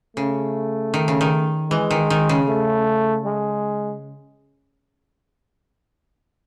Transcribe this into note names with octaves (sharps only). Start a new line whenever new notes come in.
C#3 A3
D#3
C#3
D#3
E3 G#3
D#3
D#3
C#3
A3
G#3